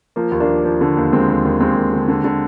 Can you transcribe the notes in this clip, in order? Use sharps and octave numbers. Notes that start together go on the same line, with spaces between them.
F3 A#3
D#2
A#3 D4
F3
F3
D3
D#2
D#2 G#3 C4
D#2
D#2
D#2 G#3 C4
D#2
D3
D3
D3